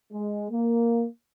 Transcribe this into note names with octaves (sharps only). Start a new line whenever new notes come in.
G#3
A#3